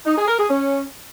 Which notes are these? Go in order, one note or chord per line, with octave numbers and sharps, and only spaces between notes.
D#4
G#4
A#4
G#4
C#4